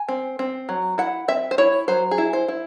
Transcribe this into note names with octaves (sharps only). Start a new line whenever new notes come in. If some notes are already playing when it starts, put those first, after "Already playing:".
Already playing: G#5
C4
C4
F#3
E4 F#5
C4 E5
C5
E4 C#5
F#3 C5
G#4
E4
C5
E4